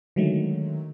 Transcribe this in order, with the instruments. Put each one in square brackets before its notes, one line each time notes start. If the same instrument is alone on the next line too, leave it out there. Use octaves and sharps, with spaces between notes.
[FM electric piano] D3 D#3 F#3 G#3 A3